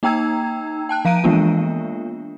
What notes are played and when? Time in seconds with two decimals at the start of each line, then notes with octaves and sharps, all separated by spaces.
0.03 A#3 D#4 G5 A#5 E6 G#6
0.89 G5 A5 F#6
1.05 F3 F5 A#5 D7 D#7
1.24 E3 G#3 A#3 B3 D4 F4